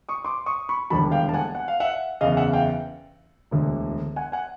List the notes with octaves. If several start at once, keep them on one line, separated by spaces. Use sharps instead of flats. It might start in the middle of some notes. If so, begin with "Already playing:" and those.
C#6 D#6
C6 D6
C#6 D#6
B5 C#6
E1 D#2 D3 G3 A5 B5
F5 G5
A5
F#5 G#5
F#5
F5
E5 F#5
F#1 E2 C#3 D#5 F5
E5 F#5
F5 G5
E1 D2 D3
F#5 G#5
F#5 G#5